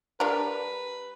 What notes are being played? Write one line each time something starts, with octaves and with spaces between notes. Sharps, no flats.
G3 D4 A#4 B4